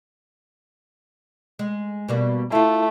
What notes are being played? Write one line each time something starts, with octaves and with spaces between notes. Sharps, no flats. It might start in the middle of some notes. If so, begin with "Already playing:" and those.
G#3
B2 G3 A#3
A3 E4 F4